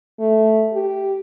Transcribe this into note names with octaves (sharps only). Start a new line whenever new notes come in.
A3
G4